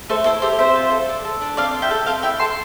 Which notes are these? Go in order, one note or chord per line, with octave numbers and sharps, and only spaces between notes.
A3 A4 C5
E4 A4 C5
G4 A4 C5
C4 C5 E5
F4
A4
D4
A4
D4
C4 D5 F5
F4
E5 G5
A4
C4 F5 A5
E4 E5 G5
A4 A5 C6